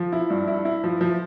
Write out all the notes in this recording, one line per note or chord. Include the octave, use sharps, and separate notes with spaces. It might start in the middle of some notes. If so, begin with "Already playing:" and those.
Already playing: F3
E4
G2
E4
E4
F3
F3